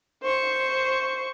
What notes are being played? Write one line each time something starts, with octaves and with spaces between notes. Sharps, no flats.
C5 C#6